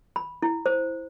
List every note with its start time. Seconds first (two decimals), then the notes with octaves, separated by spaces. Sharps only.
0.16 B5
0.42 E4
0.66 C5